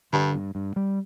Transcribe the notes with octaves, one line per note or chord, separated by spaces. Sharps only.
G2 D3
G2
G2
G3